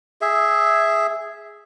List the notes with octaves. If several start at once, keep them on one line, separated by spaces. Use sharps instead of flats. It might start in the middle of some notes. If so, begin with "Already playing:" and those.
G#4 E5